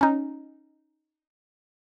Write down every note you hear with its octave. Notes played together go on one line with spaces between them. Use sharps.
C#4 D#4